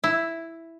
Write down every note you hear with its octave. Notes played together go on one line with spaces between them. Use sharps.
E4